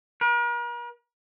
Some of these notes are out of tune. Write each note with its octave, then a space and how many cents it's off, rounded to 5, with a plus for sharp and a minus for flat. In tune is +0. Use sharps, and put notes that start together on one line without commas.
A#4 +45